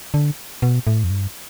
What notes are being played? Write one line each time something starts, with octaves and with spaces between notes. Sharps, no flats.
D3
B2
A2
F2
G2